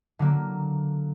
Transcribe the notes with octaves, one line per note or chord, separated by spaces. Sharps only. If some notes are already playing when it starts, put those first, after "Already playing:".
D3 F#3 A#3